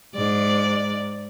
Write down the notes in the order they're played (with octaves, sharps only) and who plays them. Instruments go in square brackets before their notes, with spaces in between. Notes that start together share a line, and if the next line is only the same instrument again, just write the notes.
[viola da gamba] G#2 D5